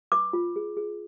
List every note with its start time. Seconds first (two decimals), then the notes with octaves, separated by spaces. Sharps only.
0.12 B4 D6
0.33 F4
0.56 G#4
0.77 G#4